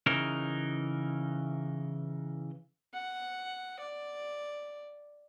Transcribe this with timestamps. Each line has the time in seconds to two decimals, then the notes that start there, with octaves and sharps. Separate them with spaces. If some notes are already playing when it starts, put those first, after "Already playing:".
0.06 C#3 E3 D#4 A#4
2.93 F#5
3.80 D5